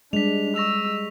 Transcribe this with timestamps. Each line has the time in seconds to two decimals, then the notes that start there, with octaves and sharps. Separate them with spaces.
0.13 G3 G#3 D4 B6 F7
0.56 C#6 E6 A#6 F7